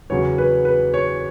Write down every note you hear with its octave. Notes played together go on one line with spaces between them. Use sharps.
E2 C#3 F#3 C#5
B4
B4
C#5